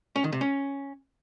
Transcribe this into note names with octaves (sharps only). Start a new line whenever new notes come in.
C#4
D#3
C3
C#4